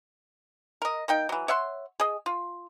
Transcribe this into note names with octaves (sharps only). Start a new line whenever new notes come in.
A#4 D#5
A#3 D#4 G5
E3 F#3
C#5 E5 F#5 C6
G#4 D#5
F4